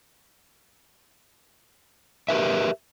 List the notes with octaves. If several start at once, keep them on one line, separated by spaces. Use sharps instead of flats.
G4 A#4 B4 E5